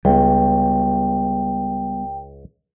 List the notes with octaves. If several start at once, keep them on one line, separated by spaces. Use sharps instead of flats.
C#2 G3 B3 G5